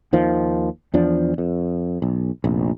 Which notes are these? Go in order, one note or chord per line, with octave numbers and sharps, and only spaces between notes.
D#2 D#3 F3
E2 F3 D4
F2
B1
F1 A#1